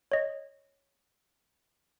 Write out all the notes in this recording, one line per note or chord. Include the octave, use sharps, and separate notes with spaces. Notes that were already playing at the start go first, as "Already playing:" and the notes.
C#5 D#5